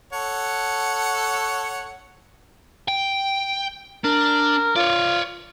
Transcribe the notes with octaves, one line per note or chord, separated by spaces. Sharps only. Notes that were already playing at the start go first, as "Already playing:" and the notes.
A4 C#5 F#5
G5
D4 A#4
F4 C#5 D5